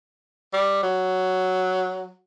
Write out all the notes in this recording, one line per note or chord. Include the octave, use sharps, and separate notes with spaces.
G3
F#3